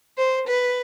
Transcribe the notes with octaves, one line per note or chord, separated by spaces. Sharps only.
C5
B4